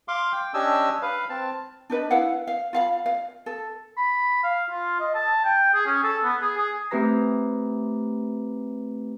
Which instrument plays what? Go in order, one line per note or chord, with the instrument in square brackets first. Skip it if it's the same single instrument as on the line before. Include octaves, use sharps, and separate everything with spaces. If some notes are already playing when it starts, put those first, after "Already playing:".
[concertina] F5 C6 D6
G5
C#4 D4 G4 D#5 G#5 E6
B4 F5
C4 A5
[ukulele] D4 D#4 B4 D#5
E4 B4 F5 F#5
F5
F4 F5 B5
F5
A4
[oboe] B5
F5
F4
D#5
A5
G5
G#4
C#4
A4
B3
G#4
G#4
[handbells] A3 C4 G4 B4 A#5 A#6